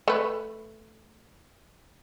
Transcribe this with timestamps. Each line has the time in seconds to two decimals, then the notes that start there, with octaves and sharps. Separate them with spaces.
0.08 A3 B4